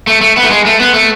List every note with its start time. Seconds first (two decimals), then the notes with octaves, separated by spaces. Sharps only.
0.07 A3
0.21 A3
0.37 B3
0.44 A3
0.51 G#3
0.66 A3
0.80 B3
0.94 A3